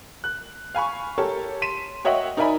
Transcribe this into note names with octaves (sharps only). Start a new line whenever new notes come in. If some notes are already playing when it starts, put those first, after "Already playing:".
F#6
F5 G#5 B5 C#6
G4 A4 A#4 C#5 A5
C6 B6 D#7 E7
F#4 C#5 D#5 E5 F#5 G5
D#4 A#4 D5 E5 G#5 B5